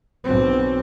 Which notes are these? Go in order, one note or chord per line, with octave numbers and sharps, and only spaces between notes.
B1 C4